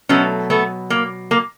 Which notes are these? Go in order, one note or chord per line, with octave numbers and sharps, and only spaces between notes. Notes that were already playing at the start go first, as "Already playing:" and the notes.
B2 F#3 A3 B3 C#4
A3 B3
A#3
A#3